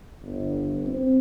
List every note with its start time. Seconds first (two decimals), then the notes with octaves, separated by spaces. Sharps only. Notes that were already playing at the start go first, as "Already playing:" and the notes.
0.23 G1
0.87 C4